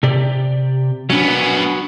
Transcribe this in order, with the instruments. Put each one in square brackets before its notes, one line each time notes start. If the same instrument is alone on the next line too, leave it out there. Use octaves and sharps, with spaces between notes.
[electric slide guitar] C3 G4 D5
[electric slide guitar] F#3 D4 [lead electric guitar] B3 C#4